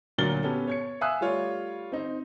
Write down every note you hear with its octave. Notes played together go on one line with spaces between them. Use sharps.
D2 A#2 F#3 A#4 A6 G7
B3 C#4 G4 A4
C#5 G#6 C#7
E5 F5 G#5 D#6 E6 F#6
G3 A3 F4 C#5
C4 D#4